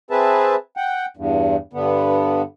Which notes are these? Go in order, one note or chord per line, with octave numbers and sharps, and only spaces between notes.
C4 G#4 B4 E5 A5
F#5 G5
E2 G2
G2 D3 B3